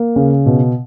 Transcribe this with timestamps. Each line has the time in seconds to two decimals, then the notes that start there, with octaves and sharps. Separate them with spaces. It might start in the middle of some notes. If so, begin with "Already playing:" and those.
Already playing: A#3
0.16 C#3
0.46 B2